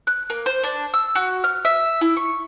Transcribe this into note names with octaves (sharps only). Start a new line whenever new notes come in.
F#6
A#3
C5
D4
E6
F#4
F6
E5
E4
C#6